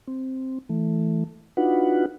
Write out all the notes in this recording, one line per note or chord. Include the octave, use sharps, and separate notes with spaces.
C4
E3 A3
D4 D#4 F4 F#4 B4 F#5